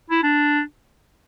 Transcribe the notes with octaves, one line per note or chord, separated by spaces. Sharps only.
E4
D4